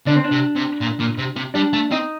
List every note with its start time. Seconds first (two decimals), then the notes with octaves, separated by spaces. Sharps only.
0.07 D3 D4
0.16 C4
0.25 D4
0.32 C3
0.56 C3
0.81 A#2
1.00 A#2
1.18 C3
1.36 C3
1.54 G3 D4
1.73 A3
1.92 C4 D#4